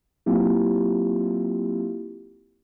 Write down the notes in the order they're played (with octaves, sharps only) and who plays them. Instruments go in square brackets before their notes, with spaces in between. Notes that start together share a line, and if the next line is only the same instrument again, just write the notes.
[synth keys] F#3 A#3 C4 E4 F4 G4